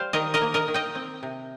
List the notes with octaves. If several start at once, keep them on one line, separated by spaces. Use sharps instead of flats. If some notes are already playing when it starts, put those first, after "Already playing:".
Already playing: G3 C5 F5
D#3 A#4 D#5
A#4 D#5
A#3
A#4 D#5
D#3
D#5 G5
C4
C3